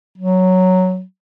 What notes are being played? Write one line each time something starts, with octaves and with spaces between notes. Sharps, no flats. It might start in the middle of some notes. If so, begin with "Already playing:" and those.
F#3